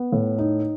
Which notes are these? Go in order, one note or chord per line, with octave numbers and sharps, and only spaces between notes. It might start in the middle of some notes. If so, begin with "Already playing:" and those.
Already playing: B3
A2
D#4